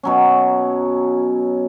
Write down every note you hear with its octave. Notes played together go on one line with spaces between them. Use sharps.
B2 F#3 C#4